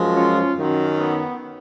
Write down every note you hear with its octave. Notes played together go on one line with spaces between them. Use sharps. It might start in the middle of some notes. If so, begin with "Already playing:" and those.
Already playing: F#2 F3 G#3
C#4 F4
F#2 D#3 F#3
B3